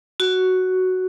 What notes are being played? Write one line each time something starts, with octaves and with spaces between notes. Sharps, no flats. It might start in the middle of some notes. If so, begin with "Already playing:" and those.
F#4